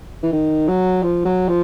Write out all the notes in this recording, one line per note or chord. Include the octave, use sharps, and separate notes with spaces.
E3
D#3
F#3
F3
F#3
F3